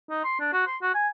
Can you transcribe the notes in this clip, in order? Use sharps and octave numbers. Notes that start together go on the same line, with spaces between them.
D#4
C6
D4
F#4
C6
F#4
G#5